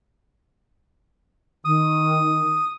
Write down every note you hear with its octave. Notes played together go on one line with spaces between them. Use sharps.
D#3 D#6